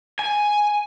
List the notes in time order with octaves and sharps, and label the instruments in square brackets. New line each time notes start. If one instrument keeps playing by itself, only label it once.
[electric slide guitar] G#5